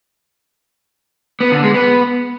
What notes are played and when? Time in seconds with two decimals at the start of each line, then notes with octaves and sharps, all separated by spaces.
1.41 B3
1.52 D3
1.63 G#3
1.74 B3